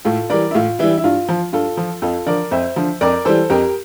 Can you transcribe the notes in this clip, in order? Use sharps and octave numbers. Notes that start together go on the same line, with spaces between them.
A2 F4 A4
E3 G3 A#4 D5
E4
A2 F4
E3 G3 E4
E4
G2 F4
F3
G2 F4 A4
F3
F2 F4 A4
D3 F3 A#4 D5
F2 C5 E5
D3 F3
F2 A#4 D5
E3 G3 A4 C5
F2 G4 A#4